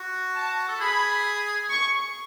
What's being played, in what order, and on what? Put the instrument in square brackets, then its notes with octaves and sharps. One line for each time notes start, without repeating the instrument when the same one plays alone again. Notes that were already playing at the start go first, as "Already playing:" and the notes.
Already playing: [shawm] F#4
[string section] A5
[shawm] A4
[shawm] G#4 [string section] B5
[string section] C#6